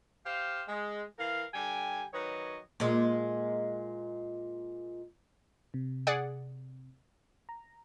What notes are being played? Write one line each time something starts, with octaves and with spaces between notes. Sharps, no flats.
G4 C5 F5
G#3
E3 A#4 F5
D3 G3 G5 G#5
D#3 F#3 B4 C#5 D#5
A#2 G#3
C3
G#4 D5 F#5
A#5